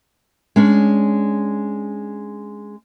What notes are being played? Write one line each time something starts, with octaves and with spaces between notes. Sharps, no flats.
G#3 C#4 D4